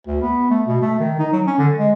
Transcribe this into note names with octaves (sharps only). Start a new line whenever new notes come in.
D2
B3
A3
B2
A3
D#3
D#4
F#3
C#4
D3
G#3